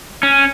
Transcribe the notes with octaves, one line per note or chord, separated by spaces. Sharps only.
C#4